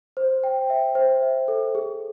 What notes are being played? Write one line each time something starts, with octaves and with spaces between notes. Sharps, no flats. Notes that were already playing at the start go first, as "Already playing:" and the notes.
C5
G5
E5
C5
E5
A4
G#4